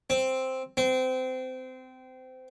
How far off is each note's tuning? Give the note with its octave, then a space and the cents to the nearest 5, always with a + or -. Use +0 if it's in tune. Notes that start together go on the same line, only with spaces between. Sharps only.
C4 +0
C4 -25